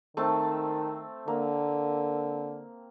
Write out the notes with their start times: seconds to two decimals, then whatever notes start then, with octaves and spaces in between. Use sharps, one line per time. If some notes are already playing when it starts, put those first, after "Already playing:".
0.17 D#3 A3 C4 A5
1.28 D3 A#3